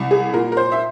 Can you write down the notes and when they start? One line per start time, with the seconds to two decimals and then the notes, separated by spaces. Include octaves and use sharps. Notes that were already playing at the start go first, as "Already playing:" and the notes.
Already playing: C2
0.11 G#4
0.34 A#2 A#4
0.52 A#4
0.57 C5
0.72 E5